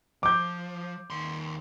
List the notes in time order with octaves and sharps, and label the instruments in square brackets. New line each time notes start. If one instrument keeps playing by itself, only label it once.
[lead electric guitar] F3 [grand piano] D6 G6
[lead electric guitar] D#2 C6